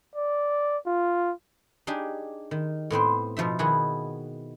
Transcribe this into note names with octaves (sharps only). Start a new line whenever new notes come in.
D5
F4
D4 D#4 G4 G#4
D#3
A2 B3 C4 C5
B2 F3 D#4 E5
D#3 B3 E4 F#4 G#4